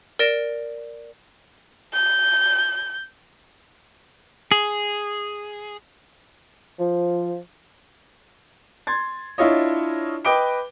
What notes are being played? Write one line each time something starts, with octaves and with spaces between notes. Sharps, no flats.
A#4 D5 A#6 D7 E7
G6
G#4
F3
C6 G#6 A6
D4 E4 F4 C#5 D#5
B4 D#5 G5 D6 D7 G7